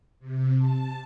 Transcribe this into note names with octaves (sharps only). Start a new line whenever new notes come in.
C3
A5